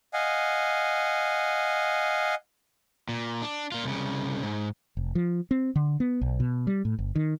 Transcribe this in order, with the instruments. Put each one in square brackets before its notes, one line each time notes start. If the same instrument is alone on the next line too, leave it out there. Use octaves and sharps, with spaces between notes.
[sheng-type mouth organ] D#5 F5 F#5 G#5
[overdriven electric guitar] A#2
D4
A#2 F4
C2 C#3
G#2
[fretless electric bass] F1
F3
C4
D3
B3
B1
B2
G3
A2
G1
D#3